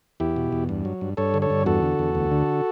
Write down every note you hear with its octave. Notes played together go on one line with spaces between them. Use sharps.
E2 E4 G4
B2
E2
G2
F#3
G2
G2 A4 C#5
D3
A4 C#5
G2
E2 F#4 A4
D3
E2
D2
D3